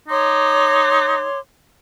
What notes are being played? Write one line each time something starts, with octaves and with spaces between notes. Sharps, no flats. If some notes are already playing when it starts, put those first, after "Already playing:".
D#4 C#5 C6 D6